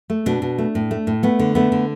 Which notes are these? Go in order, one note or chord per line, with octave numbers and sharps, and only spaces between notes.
A3
B2 D4
B2
A3
A2
A3
A2
A3 B3
D3
A3 B3
D3